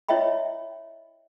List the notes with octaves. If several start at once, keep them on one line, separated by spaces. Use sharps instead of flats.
E4 C#5 D#5 E5 G5 B5